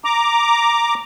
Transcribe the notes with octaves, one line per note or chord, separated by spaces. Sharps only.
A#5 D6